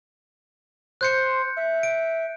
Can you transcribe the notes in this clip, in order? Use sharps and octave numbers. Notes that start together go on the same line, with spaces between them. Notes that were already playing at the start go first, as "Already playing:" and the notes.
C5 F#6 G6 C#7
E5
D7